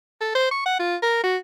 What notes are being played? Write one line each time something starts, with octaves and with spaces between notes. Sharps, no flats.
A4
C5
C#6
F#5
F4
A#4
F#4